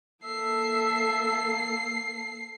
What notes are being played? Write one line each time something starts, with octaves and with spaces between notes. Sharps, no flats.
A#3 A4 E5 C7